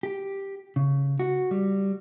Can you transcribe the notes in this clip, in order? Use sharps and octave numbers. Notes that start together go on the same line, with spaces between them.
G4
C#3
F#4
G3